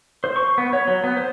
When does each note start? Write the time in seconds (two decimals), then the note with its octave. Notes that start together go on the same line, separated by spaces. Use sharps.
0.24 C5
0.36 C#6
0.58 B3
0.73 C#5
0.88 F#3
1.04 B3
1.17 C5